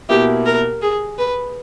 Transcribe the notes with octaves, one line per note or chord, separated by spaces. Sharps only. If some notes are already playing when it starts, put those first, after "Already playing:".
B2 A#3 E4 G4
A#4
G#4
B4